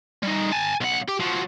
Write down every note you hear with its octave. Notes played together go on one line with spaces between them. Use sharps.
G3 D#4
G#5 A5
B1 F#5
G4
F3 F#3